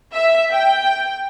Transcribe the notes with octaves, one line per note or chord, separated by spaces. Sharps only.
E5
G5